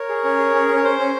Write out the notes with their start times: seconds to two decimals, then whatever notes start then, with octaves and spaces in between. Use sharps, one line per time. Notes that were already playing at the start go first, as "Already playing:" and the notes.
Already playing: A#4 C#5
0.09 G#4
0.24 C#4
0.38 G#4
0.54 C#4
0.69 C#4
0.76 C#5
0.84 C#4 C5
0.99 C#4